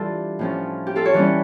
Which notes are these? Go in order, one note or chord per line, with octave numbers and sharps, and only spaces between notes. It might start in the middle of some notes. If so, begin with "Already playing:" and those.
Already playing: E3 G3 D4 F4 G4 A4
A2 F3 C#4
G4
F4 A4
A4 C#5
E3 G3 C#4